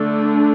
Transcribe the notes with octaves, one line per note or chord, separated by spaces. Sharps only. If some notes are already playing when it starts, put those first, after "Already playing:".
Already playing: D3 A3 D4 A4